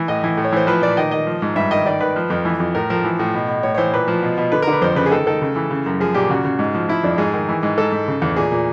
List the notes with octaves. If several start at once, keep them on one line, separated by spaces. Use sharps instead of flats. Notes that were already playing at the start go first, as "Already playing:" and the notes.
Already playing: E3
A2 D#5
E3
A2
C#5
E3 C5
F3 B4
A#2 D5
D#3 D#5
D#3 D#5
F3
G#2
G2 E5
D#3 D#5
D#3 D5
D#3 B4
F3
F2
E3
F2
A2 A#4
F3 A#4
E3
A2
B2
B2
A2 C#5
C#5
E3 C5
A#2 B4
F3
B2
B2
D3 B4
A#4
D3
B4
F2 C5
C#3 B4
G#4
D#3 A4
D#3 A4
C#3
E3
C#3
F#2
F3 G#4
A#2 G4
C#3 F#4
C#3
G#2
F3
F3 E4
F2 D4
G#2 G#4
D#3
E3
G#2
G#2 A4
G#2
C#3
E2
A#2 G#4
A#2